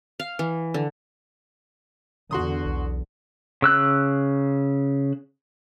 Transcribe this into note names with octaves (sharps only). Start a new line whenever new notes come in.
F5
E3
D3
E2 D3 F#4 C6 D#6
B1
C#3 E6 F#6